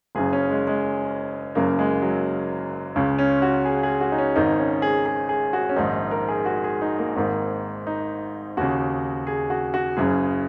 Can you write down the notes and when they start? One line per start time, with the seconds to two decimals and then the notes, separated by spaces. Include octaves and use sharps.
0.15 F#1 F#2 C#3 G#4
0.33 C#4
0.50 G#3
0.67 G#3
1.55 F#1 F#2 C#3 A#3
1.79 G#3
2.02 F#3
2.96 C#2 C#3
3.18 C#4
3.42 F#4
3.65 G#4
3.83 G#4
4.01 F#4
4.12 D#4
4.18 C#4
4.36 G#1 G#2 D#3 D#4
4.59 C#4
4.82 G#4
5.06 G#4
5.29 G#4
5.53 F#4
5.69 C#4
5.76 A#1 G#2 D#3 D#4
6.11 A#4
6.29 G#4
6.46 F#4
6.64 G#4
6.82 D#4
6.99 A#3
7.16 G#1 G#2 D#3
7.87 D#4
8.57 D#2 C#3 F#4
9.27 G#4
9.50 F#4
9.74 F#4
9.97 F#1 F#2 C#3 G#4